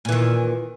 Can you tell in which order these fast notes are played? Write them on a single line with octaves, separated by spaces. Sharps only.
A#2 E3 D#3